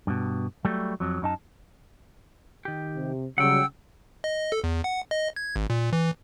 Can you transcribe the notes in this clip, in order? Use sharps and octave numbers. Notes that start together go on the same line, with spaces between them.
G2 B2
F#3 G3 A3
F2 F#3
F#2 D#4 A5
D#3 G4
C3
C#3 F#3 G3 F#5 G5 E6
D#5
A4
E2
F#5
D#5
G#6
G#1
A#2
E3